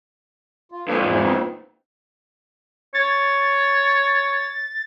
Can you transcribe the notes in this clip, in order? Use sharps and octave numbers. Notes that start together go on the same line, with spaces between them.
F4
F2 A#2 A4 B4 F5
E2 G#2 E3
B3 C4 D#4
C#5 A6